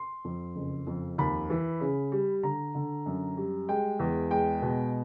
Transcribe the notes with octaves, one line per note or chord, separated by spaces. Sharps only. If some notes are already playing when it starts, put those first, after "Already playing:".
Already playing: C6
F2
F#1
F2
D#2 B5
E3
C#3
G3
D3 A#5
D3
F#2
G3
G#3 G5
E2
G#3 G5
B2